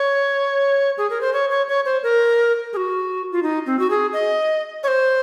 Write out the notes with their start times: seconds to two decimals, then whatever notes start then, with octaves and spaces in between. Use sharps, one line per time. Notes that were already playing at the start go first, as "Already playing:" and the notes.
Already playing: C#5
0.98 G#4
1.10 A#4
1.21 C5
1.33 C#5
1.50 C#5
1.69 C#5
1.85 C5
2.03 A#4
2.73 G#4
2.77 F#4
3.32 F4
3.43 D#4
3.66 C4
3.79 F#4
3.90 G#4
4.13 D#5
4.83 C#5
4.88 C5